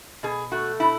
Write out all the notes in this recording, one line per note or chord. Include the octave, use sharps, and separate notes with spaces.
B2 G#4
A3 F#4
B2 E4